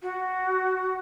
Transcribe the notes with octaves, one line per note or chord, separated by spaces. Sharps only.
F#4